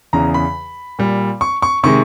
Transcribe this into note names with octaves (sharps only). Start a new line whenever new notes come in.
E2 C#3 E3 A#5
B5
A#2 G3
C#6
C#6
C3 D#3 G#3 C#6